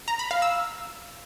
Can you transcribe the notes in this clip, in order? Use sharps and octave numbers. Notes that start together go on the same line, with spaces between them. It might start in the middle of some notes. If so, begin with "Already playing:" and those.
A#5
B5
F5
E6